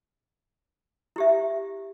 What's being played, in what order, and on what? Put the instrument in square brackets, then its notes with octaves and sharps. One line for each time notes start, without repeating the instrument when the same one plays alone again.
[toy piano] E4 G4 E5